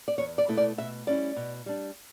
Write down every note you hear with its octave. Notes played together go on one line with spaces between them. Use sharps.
D5
E2 C#5
D5
B2 A3 E4
D5
B2 E5
G3 C#4 E4 D5
B2
G3 D4